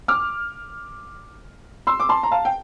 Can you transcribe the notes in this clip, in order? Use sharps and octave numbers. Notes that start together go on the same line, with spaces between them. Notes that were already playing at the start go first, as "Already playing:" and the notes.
D6 F6
C6 E6
D6
A5 C6
A#5
F5 A5
G5